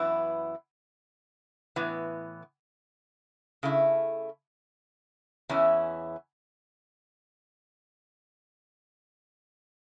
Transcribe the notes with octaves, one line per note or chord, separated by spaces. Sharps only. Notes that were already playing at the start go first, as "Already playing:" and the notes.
Already playing: F#2 E3 B3 E4
A2 E3 B3
C#3 A3 E4
E2 E3 C#4 E4